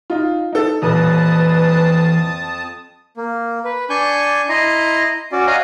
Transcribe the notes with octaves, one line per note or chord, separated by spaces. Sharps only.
D#4 F4
D#4 A4
D#1 F2 E3 B4 A5 D#6
A#3
B4
D4 G#5 C#6 G6
E4 D#5 A#5 C6
C#4 F#4 D5
C#5 D#5 F5 F#5 G#5 A#5